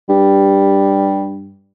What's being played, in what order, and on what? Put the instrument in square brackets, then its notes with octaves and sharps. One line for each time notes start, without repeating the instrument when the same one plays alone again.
[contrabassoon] G2 [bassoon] G3